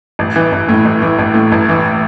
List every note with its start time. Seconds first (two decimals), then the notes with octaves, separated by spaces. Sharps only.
0.19 A1
0.36 E3
0.52 A1
0.69 A2
0.85 A1
1.02 E3
1.19 A1
1.34 A2
1.52 A1
1.69 E3